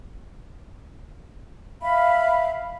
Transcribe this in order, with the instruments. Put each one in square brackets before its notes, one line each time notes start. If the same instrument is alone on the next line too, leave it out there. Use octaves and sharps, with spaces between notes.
[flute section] E5 F5 B5